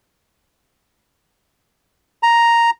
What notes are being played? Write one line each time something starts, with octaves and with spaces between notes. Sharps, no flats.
A#5